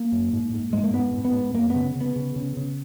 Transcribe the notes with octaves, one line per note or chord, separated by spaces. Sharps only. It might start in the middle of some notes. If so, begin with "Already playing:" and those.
Already playing: A#3
F#2
G#2
G#2
G#2 G#3
A#3
G#2 B3
G#2
B3
G#2
F#2 A#3
B3
C#3
C#3
B3
C#3
C#3
C#3